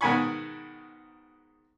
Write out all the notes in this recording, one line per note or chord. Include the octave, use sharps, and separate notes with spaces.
G#2 B2 D#3 G#5 B5 C#6